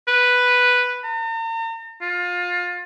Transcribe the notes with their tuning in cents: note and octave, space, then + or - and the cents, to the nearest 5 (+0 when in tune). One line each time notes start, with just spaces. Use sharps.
B4 +0
A#5 -45
F4 +25